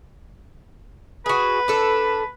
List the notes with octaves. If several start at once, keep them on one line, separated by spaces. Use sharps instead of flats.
F#4 G#4 B4
D4 A4